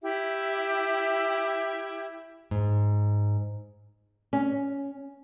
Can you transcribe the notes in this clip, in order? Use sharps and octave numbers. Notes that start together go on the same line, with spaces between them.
E4 G4 E5
G#2
C#4